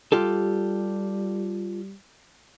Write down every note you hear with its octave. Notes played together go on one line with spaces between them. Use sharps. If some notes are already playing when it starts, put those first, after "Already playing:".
G3 F4 G4 A4